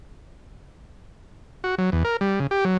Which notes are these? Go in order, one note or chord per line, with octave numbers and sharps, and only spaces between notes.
F#4
F#3
E2
A#4
G3
C#3
G4
F#3